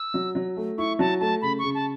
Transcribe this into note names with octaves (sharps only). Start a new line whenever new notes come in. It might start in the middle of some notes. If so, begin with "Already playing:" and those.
Already playing: E6
F#3
F#3
A3
E4 C#6
F#3 A5
A3 A5
C#3 B5
C#3 C#6
A5